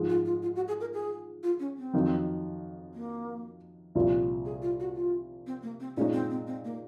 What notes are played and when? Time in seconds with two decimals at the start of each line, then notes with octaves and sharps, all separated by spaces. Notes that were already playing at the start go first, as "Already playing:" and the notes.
Already playing: G#2 F3 G#3
0.09 F4
0.25 F4
0.42 F4
0.56 F#4
0.68 G#4
0.81 A#4
0.94 G#4
1.43 F4
1.60 C#4
1.78 C4
1.93 F2 D#3 F#3
2.94 A#3
3.95 C2 A#2 F3
4.45 G#4
4.62 F4
4.80 F#4
4.96 F4
5.47 C4
5.63 A#3
5.80 C4
5.97 A#2 G#3 C#4 D#4
6.13 C4
6.30 C4
6.47 C4
6.65 A#3